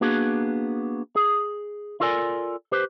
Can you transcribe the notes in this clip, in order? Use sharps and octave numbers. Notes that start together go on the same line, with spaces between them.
A#3 B3 D4 F#4 G#4
G#4
E4 F4 A4 A#4 D5 G#5
G4 B4 C5